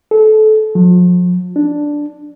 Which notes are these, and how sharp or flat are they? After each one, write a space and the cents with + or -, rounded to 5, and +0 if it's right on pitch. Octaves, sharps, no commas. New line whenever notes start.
A4 -25
F3 +40
D4 +0